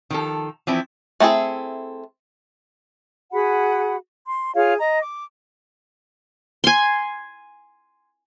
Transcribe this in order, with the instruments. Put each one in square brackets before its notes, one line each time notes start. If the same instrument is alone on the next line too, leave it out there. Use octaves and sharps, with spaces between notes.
[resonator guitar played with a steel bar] D#3 F3 A4
E3 F3 C4 E4
[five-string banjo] A3 C4 E4 G#4
[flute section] F#4 G#4 F#5 B5
C6
F4 G#4 C#5 F5
D#5 A#5
D6
[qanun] G#5 C6